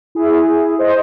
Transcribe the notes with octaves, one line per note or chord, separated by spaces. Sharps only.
E4 G#4
C5 D#5